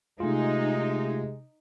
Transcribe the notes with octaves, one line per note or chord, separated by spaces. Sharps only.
C3 G#3 A3 D#4 F4